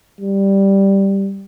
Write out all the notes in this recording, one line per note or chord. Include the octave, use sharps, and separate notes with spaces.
G3